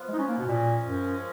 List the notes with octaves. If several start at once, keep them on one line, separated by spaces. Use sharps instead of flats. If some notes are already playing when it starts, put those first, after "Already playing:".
Already playing: F3 B3 F4
G#3
D#4
C#4
A#3
B2
A#2 F3 G#3 C#4
F#2